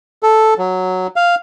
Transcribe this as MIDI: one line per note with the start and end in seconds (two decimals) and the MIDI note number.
0.23 0.54 69
0.58 1.07 54
1.16 1.35 77